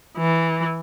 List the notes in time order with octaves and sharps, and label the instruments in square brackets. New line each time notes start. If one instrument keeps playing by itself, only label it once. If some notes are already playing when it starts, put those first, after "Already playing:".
[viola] E3